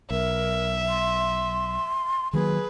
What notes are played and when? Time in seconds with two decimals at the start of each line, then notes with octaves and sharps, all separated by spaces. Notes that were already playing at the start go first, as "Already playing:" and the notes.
0.11 B1 A#4 E5
0.89 C6
2.33 D#3 F#3 A#3 G#4 B4